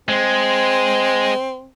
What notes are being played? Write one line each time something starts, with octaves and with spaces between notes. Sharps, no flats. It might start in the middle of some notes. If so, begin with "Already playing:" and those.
G#3 C4